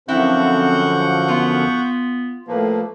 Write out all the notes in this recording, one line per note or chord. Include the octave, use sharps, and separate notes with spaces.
F#2 D3 F3 C4 E4 F#5 C#6 G6
B3 F4
A2 F3 A#3 B4